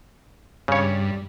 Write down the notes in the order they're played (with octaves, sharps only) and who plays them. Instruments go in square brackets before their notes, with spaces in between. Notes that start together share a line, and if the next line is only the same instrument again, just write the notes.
[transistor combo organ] G2 [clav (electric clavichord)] C#3 C#5